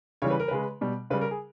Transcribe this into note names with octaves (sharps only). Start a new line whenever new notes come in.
C#3 E3 G3 C#5
B4
A#4
C#3 G#3 B4
B2 G3
C#3 G3 B4
A#4
G#4